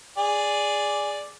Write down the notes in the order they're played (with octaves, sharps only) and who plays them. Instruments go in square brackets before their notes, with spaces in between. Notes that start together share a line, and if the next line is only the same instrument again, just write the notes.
[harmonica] G#4 D5